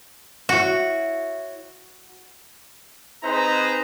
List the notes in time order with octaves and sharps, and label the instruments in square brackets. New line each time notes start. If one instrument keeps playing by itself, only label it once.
[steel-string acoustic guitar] E4 C#5 [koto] F#4
[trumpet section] C4 D#4 G#4 B4 C5 A#5